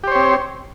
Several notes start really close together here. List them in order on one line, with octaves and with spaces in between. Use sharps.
G4 C5 C#5 C4